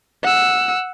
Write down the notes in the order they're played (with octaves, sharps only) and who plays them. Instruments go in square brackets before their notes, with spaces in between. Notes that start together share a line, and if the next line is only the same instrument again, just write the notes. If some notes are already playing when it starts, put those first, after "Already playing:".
[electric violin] F#5 E6